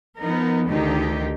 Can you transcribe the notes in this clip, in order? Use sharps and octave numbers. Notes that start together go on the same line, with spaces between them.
F3 B3 D#4 A#4
D2 D#3 D#4 G4